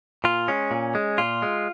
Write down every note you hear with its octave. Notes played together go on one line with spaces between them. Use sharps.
A#2 F4
G#3 C#4
A#2
G#3
A#2 F4
G#3